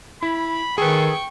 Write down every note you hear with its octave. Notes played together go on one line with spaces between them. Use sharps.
E4 B5
D#3 G#4 A4 B4 G5 C#6